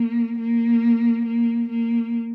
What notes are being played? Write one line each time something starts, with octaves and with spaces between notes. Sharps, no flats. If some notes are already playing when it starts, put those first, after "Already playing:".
Already playing: A#3
A#3
A#3
A#3